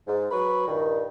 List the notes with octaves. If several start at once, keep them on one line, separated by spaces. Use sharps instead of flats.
G#2
F#3 B4 B5 C#6
G2 A#2 D#3